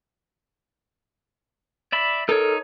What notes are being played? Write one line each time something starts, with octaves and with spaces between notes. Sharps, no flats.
D5 E5 B5
D#4 A4 A#4 C#5